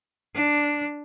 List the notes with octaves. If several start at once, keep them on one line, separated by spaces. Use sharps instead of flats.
D4